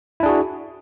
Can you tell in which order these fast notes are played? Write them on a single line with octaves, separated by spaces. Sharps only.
E4 D4 G#4 F#4